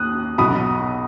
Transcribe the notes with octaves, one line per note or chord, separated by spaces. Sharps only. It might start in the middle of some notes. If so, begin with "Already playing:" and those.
Already playing: D#2 D#6 F#6
B1 B2 F#3 B5 D#6